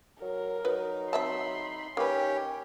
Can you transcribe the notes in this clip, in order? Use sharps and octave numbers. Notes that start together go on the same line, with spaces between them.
F#3 A#4
F#3 D#4 B4
C4 E5 A5 B5 C6
D#3 A#3 C#4 G4 B4 C#5 G5